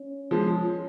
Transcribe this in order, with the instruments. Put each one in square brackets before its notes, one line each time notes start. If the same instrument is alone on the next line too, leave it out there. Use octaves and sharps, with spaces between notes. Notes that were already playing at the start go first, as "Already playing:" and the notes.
Already playing: [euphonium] C#4
[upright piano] F3 G#3